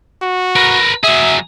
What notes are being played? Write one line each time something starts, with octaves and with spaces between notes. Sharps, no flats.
F#4
A#4 B4
F#3 G#4 E5